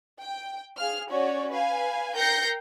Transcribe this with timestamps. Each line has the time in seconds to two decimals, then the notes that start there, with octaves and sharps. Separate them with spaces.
0.21 G5
0.77 G#4 F5 F6
1.11 C#4 F#4 C#5 D5
1.50 B4 F5 G#5
2.15 A#4 G5 G6 A#6 C7 C#7